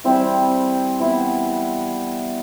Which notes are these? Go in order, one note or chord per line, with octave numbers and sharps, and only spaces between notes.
E3 G3 C4 G5
E3 B3 E4